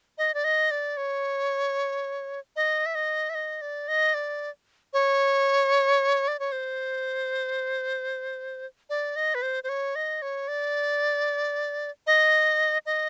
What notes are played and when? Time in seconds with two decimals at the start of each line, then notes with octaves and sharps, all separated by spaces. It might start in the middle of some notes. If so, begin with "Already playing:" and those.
0.18 D#5
0.34 D5
0.44 D#5
0.71 D5
0.97 C#5
2.56 D#5
2.86 E5
2.95 D#5
3.30 E5
3.35 D#5
3.61 D5
3.88 D#5
4.14 D5
4.93 C#5
6.28 D5
6.39 C#5
6.52 C5
8.90 D5
9.16 D#5
9.35 B4
9.42 C5
9.64 C5
9.69 C#5
9.95 D#5
10.22 C#5
10.48 D5
12.07 D#5
12.86 D#5